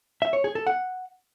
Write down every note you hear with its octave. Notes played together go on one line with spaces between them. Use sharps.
E5
C#5
G#4
A4
F#5